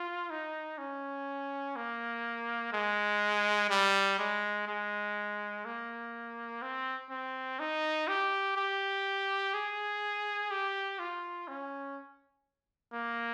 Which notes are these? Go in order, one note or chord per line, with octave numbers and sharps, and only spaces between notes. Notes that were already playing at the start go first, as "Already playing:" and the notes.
Already playing: F4
D#4
C#4
A#3
G#3
G3
G#3
G#3
A#3
C4
C4
D#4
G4
G4
G#4
G4
F4
C#4
A#3